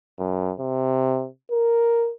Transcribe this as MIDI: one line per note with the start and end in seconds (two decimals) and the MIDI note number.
0.19 0.52 42
0.59 1.26 48
1.51 2.11 70